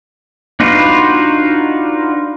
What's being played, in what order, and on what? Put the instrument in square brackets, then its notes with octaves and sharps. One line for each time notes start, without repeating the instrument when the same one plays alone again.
[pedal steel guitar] D4 D#4 F4 F#4 B4